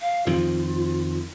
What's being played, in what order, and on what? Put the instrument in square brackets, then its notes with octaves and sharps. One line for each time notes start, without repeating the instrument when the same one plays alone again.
[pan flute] F5
[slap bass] F2 D#3 F3 [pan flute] F4